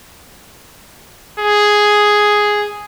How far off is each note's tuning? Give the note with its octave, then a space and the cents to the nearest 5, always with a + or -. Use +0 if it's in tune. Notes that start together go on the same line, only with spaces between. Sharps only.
G#4 +0